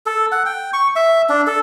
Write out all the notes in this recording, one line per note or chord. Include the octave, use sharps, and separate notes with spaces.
A4
F#5
G5
C#6
E5
D4
A4